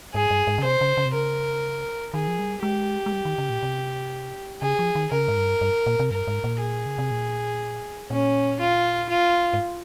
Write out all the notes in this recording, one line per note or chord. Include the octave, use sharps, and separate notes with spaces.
G#2 G#4
G2
G#2
C#3
C3 C5
C#3
C#3
C3
C#3 A#4
D#3 G#4
F3
G3
G#3 G4
G#3
G3
D#3
C#3
A#2
C3
C#3 G#4
F3
D#3
C#3 A#4
G#2
G2
G2
A#2
C3
G2 A#4
G#2
A#2
G#4
C#3
C3
A#2
A#2 C#4
F4
F4
G#2